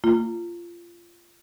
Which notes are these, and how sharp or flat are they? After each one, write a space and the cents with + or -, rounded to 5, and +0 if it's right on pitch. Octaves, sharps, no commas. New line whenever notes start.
A#3 -25 F4 -20